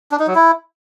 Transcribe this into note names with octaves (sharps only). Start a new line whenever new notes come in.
D4
D#4
F#3
E4